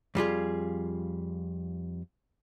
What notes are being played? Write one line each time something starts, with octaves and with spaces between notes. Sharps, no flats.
F2 G3 F4 G#4